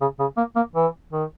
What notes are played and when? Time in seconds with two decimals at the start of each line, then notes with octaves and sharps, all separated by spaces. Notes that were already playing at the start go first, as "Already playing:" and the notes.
0.01 C#3
0.19 C#3
0.37 A#3
0.56 A#3
0.75 E3
1.12 D#3